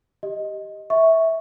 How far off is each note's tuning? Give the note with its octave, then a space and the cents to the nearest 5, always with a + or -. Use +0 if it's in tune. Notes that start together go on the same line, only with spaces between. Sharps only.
G4 +0 D#5 +5
E5 -15 C#6 +0